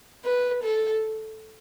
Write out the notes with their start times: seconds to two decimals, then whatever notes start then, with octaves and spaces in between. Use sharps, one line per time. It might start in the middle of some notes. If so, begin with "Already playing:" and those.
0.24 B4
0.63 A4